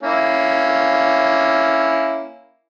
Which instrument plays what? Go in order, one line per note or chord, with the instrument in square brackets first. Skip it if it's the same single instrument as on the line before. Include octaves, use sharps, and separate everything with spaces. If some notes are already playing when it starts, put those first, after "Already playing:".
[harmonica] A#3 C#4 E4